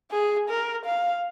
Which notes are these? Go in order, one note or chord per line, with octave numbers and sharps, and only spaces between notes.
G#4
A#4
F5